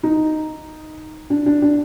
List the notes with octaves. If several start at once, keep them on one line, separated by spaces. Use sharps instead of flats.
D#4
D4
D4
D4